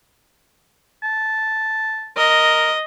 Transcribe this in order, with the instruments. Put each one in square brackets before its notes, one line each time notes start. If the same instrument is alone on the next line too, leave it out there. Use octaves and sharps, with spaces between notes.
[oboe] A5
[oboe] A#4 [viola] D#5